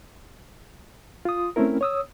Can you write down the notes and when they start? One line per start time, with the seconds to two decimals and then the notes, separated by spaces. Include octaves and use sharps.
1.25 F4 D#6
1.56 A3 C4 C#4 E4 A#4
1.81 C#5 D#6 E6